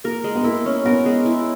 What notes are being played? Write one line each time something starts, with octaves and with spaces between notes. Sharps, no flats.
A#3 A#4
G#3
B3
A#3 E4
C#4
B3 A#4
G#3
E4